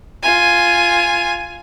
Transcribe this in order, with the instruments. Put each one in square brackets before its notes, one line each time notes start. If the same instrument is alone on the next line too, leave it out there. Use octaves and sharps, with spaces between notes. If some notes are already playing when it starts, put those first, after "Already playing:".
[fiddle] F4 G#5